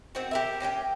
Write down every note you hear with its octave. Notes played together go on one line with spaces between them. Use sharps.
D#3 C4 F#4
G4 A#4 E5
A#3 C#4 G4 G5